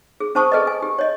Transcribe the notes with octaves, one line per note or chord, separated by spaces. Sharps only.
G#4
C#4 C5 A5 C#6 D#6
G#4 A4 B4 D5 D#5
G#5
G4
C#5 D#5